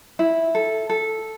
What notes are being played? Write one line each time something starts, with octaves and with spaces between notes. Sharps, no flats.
E4
A4
A4